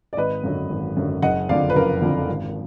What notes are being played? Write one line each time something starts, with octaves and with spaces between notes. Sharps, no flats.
D5
G#1 B4 D#5
F#2 D3 F#3
G#1
F#2 D3 F#3
F#1 D#5 F#5
F2 D3 F3 D5 F5
B4
F#1 A#4
F2 D3 F3
G#1